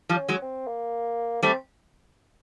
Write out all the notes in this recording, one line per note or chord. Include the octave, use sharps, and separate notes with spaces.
F3 G3
C#4
F#3 G#3
C4
A#3
G3 A3 C4